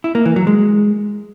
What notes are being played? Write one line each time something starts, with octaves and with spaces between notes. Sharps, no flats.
E4
A#3
E3
F#3
G#3